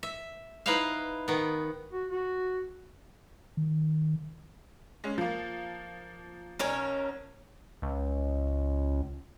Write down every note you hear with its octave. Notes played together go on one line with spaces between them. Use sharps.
E5
D#4 E4 B4 C5 E5 F5
D#3 B3
F#4
F#4
D#3
G#3 C#4
F3 A#3
B1 C#4 A#4 C#5
C#2